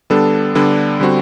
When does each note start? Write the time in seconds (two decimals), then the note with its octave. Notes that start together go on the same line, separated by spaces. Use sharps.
0.10 D3 G3 B3 D4 A4
0.55 D3 G3 B3 D4 A4
1.00 D3 G3 C4 F#4